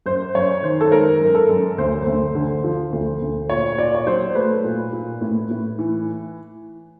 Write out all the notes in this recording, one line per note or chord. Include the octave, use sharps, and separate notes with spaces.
F#2 C5
F#2 C#5
D#3 C5
A4
G#3 A#4
F#2
A4
F#2
D2 C5
D2
D3
F3
D2
D2
A#2 C#5
A#2 D5
C#5
F#3 C5
A3 B4
A#2
A#2
A2
A2
E3